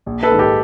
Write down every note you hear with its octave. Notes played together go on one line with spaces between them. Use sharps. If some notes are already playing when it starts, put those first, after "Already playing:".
A#1
A4 B4
G#2 D#3
G4 A4